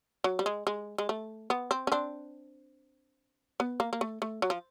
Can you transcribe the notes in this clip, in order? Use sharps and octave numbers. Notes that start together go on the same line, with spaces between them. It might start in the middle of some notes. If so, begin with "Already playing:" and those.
F#3
G3
G#3
G#3
G#3
A3
B3
C4
C#4
C4 D4
B3
A#3
A#3
A3
A3
F#3
F3